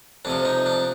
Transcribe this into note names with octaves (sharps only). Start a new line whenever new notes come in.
F2 C3 F3 D4
D#4
D4